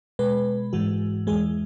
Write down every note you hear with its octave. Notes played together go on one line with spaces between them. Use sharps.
B2 G#3 B4
G#2 E3 G#3 F#4
E2 E3 G#3 G#4